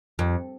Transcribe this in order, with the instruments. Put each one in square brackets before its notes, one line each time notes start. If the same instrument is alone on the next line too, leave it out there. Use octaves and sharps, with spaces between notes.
[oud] F2